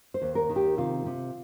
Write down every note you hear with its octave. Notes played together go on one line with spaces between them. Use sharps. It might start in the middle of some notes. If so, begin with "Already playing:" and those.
C5
D#2
A#4
D#3
G4
C3 F4
C3